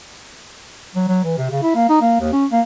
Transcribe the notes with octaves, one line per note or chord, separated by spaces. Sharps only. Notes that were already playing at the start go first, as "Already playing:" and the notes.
F#3
F#3
E3
C3
C#3
E4
A#3
D#4
A#3
D#2
C#4
A#3